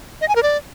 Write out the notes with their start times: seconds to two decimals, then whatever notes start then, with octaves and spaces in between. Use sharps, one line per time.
0.21 D#5
0.28 G#5
0.36 A#4
0.43 D5